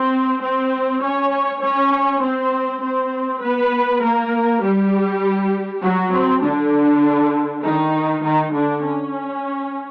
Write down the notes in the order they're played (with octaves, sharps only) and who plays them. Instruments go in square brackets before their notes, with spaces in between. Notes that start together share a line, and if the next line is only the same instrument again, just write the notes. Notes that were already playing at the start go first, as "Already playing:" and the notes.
Already playing: [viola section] C4 C5
C4 C5
C#4 C#5
C#4 C#5
C4 C5
C4 C5
B3 B4
A#3 A#4
G3 G4
F#3 F#4
C4
D3 D4
D#3 D#4
D#3 D#4
D3 D4
C#4